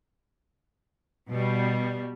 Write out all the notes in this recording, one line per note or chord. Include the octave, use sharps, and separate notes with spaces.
B2 G3